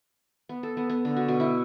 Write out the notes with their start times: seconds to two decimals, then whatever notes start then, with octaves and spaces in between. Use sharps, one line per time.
0.49 B3
0.63 A4
0.77 B3
0.89 B3
1.05 D3
1.17 F#4
1.28 B2
1.40 E4